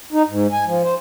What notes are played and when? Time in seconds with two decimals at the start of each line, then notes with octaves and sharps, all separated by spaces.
0.12 D#4
0.28 G#2
0.52 G#5
0.66 F3
0.83 C5